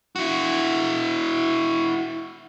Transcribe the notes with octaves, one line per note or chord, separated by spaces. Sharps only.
E4 F#4